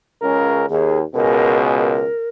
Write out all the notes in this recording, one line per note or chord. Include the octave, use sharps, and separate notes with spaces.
C#2 C#3 A#4
D#2 G#4
C#2 B2 G#4 A#4
A#4